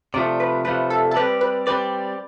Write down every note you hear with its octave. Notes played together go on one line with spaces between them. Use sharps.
C3 F3 A3 D5
B4
C3 F3 A3 B4
A4
A4
G3 C4 G4 B4 D5
B4
G3 C4 G4 B4 D5